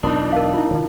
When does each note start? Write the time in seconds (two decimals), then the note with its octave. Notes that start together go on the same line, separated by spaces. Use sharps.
0.03 E1 B1 B3 D4 D#4 F4 A#4 D#6
0.33 A#4 F5
0.53 E4 F4
0.71 D3 D#3